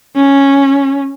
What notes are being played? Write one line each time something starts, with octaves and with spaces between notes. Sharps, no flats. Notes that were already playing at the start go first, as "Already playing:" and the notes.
C#4